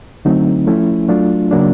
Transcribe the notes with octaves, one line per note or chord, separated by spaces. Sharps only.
D3 F#3 A3 C4 D#4
F3 A3 C#4 E4
F#3 A3 D4 F4
C#3 F#3 A#3 D4